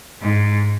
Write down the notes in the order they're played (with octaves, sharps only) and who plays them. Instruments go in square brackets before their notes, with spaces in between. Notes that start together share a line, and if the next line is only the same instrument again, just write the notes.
[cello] G#2